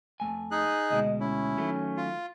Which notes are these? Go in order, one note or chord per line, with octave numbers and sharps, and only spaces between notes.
F2 A3 G#5
D#4 G#4 F#6
D2 B2 G#3 D#5
C#4 E4
D#3 F#3 A3
F4